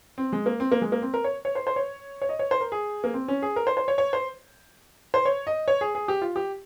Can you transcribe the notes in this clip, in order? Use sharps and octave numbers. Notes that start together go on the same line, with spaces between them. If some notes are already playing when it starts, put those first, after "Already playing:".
C4
G#3
A#3
C4
A#3
G#3
A#3
C4
A#4
C#5
C#5
C5
C5
C#5
C#5
D#5
C#5
C5
A#4
G#4
A#3
C4
C#4
G#4
A#4
C5
C5
C#5
C#5
C5
C5
C#5
D#5
C#5
G#4
G#4
G4
F4
G4